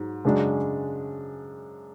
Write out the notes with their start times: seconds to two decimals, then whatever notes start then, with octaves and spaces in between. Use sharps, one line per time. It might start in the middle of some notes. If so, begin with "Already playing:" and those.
Already playing: G#2 F#3
0.25 F#2 C#3 G#3 D4 F#4